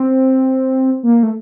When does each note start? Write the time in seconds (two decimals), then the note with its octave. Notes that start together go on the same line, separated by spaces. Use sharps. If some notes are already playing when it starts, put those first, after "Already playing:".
Already playing: C4
1.03 A#3
1.23 A3